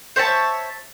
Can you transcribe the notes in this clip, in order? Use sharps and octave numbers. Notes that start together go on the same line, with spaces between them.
C5 C#5 E5 A5